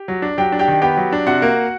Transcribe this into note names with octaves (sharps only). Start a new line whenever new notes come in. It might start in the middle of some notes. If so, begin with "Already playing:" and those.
Already playing: G4
F#3
D4
F#3 G4 G5
D4
G4 G5
D#3
B3 G4 G5
F#3
D4
C3 F#4 F#5
A#3